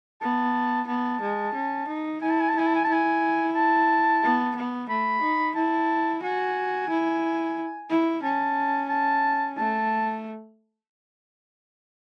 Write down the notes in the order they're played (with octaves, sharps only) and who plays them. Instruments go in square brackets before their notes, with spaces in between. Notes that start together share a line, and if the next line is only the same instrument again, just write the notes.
[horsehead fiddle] B3 [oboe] A5
[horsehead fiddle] B3 [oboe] A5
[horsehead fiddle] G#3
C#4
D#4
[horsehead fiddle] E4 [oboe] G#5
[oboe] A5
G#5
A5
[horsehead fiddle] E4 [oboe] G#5
[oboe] A5
G#5
A5
[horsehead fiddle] E4 [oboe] G#5
[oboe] A5
[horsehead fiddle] B3
B3
[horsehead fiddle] A3 [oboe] B5
[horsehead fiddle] D#4
[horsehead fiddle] E4 [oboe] A5
[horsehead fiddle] F#4 [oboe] G#5
[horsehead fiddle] E4
E4
[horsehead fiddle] C#4 [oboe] A5
[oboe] A5
[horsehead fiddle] A3 [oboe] A5